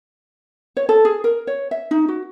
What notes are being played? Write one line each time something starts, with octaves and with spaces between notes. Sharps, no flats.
C#5
A4
G#4
A#4
C#5
E5
D#4
F#4